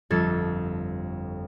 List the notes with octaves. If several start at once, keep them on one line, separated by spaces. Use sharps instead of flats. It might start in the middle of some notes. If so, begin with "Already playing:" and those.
G1 F2 A4 G#6 A6